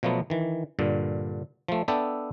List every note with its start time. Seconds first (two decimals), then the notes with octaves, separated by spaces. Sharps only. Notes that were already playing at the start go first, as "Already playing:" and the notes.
0.03 B2 F3 F#3 A3 B3
0.30 D#3 E3
0.79 G2 A#2 D3
1.68 F3 A3
1.88 B3 D4 A4 E5 G5 A5